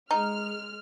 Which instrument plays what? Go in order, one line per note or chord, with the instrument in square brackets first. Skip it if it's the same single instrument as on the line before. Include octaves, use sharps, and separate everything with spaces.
[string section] G#3 F6 [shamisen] D#4